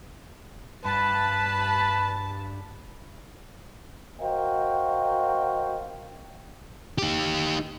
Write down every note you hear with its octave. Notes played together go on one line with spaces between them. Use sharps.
G2 B4 A5 B5
F#4 A#4 C5 D#5 F5 G5
D#4 G4